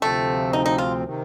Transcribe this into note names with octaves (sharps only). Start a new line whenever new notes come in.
D2 C3 F3 A3 C4
D#4
D#4
F4
C3 D#3